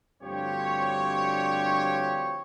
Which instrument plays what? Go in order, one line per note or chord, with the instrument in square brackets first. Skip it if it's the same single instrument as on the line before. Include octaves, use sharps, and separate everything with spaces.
[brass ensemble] D2 G2 F3 C4 G4 C#5